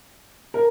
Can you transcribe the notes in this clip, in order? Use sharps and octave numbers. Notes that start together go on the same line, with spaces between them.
A#4